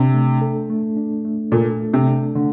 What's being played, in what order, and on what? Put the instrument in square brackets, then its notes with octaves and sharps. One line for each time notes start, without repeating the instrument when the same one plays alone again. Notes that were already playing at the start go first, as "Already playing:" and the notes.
Already playing: [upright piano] C3 [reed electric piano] D4
[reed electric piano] A3
A4
A3
D4
A3
[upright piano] A#2 [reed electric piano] A4
[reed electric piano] A3
[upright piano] C3
[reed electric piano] D4
[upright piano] D3 [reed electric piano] A3